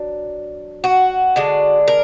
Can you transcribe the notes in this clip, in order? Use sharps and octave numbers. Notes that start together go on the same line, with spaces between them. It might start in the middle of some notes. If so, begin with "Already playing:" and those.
Already playing: F#3 D4
F#4
D3 G#3 D4
A#4